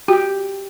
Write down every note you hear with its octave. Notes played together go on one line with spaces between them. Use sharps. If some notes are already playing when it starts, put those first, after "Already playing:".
F#4 G4